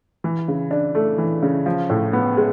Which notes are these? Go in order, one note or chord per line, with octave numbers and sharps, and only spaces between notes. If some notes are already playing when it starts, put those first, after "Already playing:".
E3
C#3
D4
A3
E3
C#3
F3
A2
B3
G#3